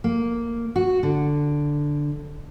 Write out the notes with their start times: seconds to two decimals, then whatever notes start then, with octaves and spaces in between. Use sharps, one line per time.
0.04 A#3
0.76 F#4
1.03 D3